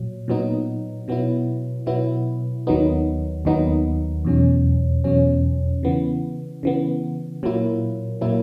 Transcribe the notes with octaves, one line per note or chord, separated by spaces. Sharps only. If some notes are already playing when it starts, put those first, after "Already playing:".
Already playing: A#2 F#3
A#2 F#3 B3 D#4
B2 F#3 B3 E4
B2 F#3 B3 E4
D#2 D#3 F#3 B3 D#4
D#2 D#3 F#3 B3 D#4
E2 B2 F#3 C#4
E2 B2 F#3 C#4
C#3 E3 B3
C#3 E3 B3
A#2 F#3 A#3 E4
A#2 F#3 A#3 E4